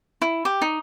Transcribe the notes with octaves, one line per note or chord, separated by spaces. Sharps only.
E4
G4
D#4